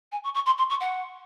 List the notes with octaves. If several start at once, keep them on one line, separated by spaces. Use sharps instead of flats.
G#5
C#6
C#6
C6
C6
C#6
F#5